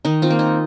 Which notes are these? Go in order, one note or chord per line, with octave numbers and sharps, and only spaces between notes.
D#3 D#4
C4 F4
A#3
D#4